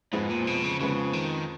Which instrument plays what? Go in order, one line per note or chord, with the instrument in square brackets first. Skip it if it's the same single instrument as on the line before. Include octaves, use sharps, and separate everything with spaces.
[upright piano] F2 F3 G#3 B3 [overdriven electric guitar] G#2
[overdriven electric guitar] A#2
B2
C#3
[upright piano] F2 F3 G#3 B3 [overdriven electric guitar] C#3
[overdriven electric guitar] D#3